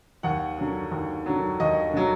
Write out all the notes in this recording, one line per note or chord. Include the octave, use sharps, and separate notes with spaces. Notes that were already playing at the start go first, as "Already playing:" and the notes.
D#2 F#5
D3 F#3
D#2
D3 F#3
D#2 D#5
D3 F#3